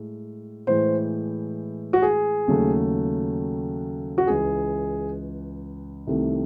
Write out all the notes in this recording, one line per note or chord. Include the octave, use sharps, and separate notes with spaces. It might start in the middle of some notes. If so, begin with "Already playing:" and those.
Already playing: A2 G#3
A2 E3 G#3 C5
F#4
G#4
D#2 C#3 F#3 A3
F#4
C#2 C#3 E3 G#4
C2 C3 D#3 A3